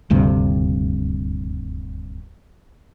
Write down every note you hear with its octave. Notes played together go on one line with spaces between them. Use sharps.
D#1 D2 G2 C3